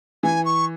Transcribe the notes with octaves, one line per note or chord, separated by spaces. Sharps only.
E3 G#5
C#6